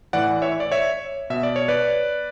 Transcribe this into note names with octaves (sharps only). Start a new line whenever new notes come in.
A2 E3 D5 F#5
C#5 E5
D5
C#5 E5
B2 E5
D5
C#5
B4 D5